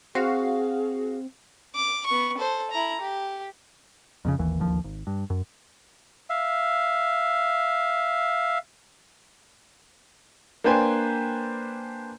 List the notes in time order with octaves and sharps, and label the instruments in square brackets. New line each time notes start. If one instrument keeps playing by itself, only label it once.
[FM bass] C4 [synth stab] F#4 F5 [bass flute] G#4
[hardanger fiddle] D6
B3 C#6
A4 C5
E4 A#5
G4
[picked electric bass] F2 A2 C#3
D#1 G#1 D#2 E3
D1 A1 D#2 F3
G#1
G2
F#2
[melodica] E5 F5
[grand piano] A#3 D4 B4 C5 G5 G#5